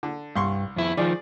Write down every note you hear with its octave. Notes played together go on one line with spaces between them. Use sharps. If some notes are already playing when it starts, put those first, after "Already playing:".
D3
C2 G2 C6 C#6
F2 E4
D#3 F3 G#4 D5